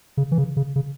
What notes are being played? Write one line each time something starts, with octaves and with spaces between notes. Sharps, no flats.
C#3
E3
C#3
C#3
C#3